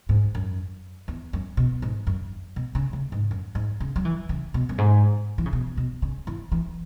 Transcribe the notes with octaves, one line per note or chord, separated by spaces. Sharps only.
G#2
F#2
E2
F#2
B2
G#2
F#2
B2
C#3
C#3
G#2
F#2
G#2
C#3
F#3
E3
C#3
B2
F#2
G#2
E3
C#3
B2
B2
C#3
E3
E3